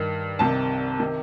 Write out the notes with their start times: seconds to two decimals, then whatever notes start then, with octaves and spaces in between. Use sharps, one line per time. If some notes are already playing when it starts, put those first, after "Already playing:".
Already playing: G2 D#3
0.39 C2 C3 D#3 A5
1.00 C3 D#3